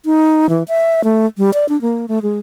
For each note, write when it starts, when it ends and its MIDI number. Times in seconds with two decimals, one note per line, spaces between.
0.05 0.49 63
0.49 0.63 52
0.68 1.04 76
1.04 1.26 57
1.38 1.53 55
1.54 1.68 74
1.69 1.79 62
1.81 2.06 58
2.08 2.19 57
2.22 2.39 56